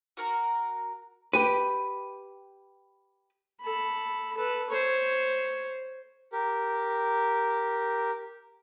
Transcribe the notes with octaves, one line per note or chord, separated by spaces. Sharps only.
F#4 A#4 A#5
G4 B4 D#7
A4 B5
A4 B4
C5 C#5
G4 A#4